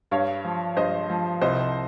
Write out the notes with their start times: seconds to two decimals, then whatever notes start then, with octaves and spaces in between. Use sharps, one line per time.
0.11 G2 C#5 F5
0.45 F3
0.77 G2 C5 D#5
1.10 F3
1.41 C2 C5 D#5